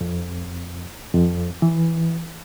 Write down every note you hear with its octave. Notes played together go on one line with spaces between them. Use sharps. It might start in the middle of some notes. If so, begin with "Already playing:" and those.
F2
F2
E3